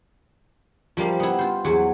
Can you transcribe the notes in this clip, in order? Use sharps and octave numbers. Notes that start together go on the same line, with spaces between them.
F3 G3 A#3 F5
B3 E4
F4 C5
E2 F#3